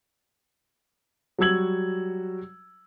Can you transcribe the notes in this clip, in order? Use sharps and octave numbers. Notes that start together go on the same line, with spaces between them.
F#3 G3 F#4 E6 G#6 F#7